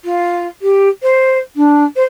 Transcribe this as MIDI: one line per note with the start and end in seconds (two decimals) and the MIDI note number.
0.04 0.47 65
0.62 0.89 67
1.02 1.38 72
1.56 1.84 62
1.96 2.04 72